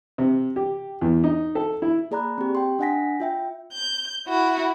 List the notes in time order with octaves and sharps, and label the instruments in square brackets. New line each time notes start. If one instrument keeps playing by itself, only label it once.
[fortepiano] C3
G4
E2
D#4
A4
E4
[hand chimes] A#3 G#4 D5 A#5 B5 F#6
C4 G4
G5 C6
D4 D#5 F#5 G#5 A#6 B6
F4 E5 G5
[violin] G6
E4 F#4